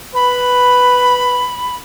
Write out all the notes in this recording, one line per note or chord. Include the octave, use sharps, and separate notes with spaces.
B4 B5